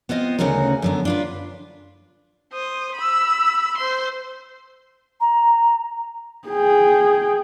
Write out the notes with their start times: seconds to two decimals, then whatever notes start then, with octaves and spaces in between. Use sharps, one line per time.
0.09 B3 C4 F4 D#5
0.39 D2 C#3 C#4 D#4 F#4 A#4
0.82 F#2 D3 B3
1.05 D4 F4 B4
2.53 C5 D#6
2.96 B5 E6
3.77 C5 C6
5.20 A#5
6.48 G#4 G5